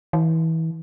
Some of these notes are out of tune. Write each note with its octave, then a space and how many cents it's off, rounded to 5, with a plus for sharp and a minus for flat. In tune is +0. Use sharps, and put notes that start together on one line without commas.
E3 -30